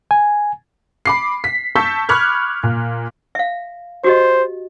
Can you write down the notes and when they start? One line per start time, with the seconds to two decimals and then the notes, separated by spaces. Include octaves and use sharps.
0.11 G#5
1.06 B5 D6 C7
1.44 B6
1.75 A5 C#6 E6 G6 B6
2.09 B5 C#6 D6 F6 F#6 G#6
2.63 A#2
3.35 E5 F5
4.04 F#4 G4 C5 D#5